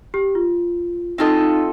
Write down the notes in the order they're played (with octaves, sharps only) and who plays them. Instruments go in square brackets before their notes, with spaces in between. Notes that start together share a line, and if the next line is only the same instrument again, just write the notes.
[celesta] G4
F4
[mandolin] C4 F4 A4 D#5 [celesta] D#4
[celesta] D#4